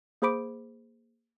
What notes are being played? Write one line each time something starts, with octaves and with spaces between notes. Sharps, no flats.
A#3 G#4 C5 B5 D6 D7